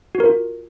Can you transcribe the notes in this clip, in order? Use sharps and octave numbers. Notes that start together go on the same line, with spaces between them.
F#4
A#4
F4